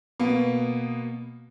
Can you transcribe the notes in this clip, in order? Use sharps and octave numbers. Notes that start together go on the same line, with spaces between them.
B2 A#3 B3